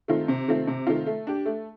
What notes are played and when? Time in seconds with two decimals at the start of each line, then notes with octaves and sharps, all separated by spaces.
0.08 D#3 A3 C4 F4
0.28 C3
0.48 D#3 A3 C4 F4
0.67 C3
0.87 D#3 A3 C4 F4
1.06 A3
1.27 D4 G4
1.45 A3